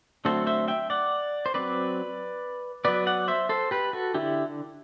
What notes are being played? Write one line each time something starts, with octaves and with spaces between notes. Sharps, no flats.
D3 F#3 A3 C4 A4 C5
C5 E5
E5 G5
D5 F#5
C5
F#3 C4 B4 D5
F#3 B3 B4 D5
D5 F#5
C5 E5
A4 C5
G4 B4
F#4 A4
D3 E4 G4